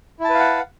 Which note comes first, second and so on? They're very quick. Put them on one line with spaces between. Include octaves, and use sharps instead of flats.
E4 A5 B4 F5 F#5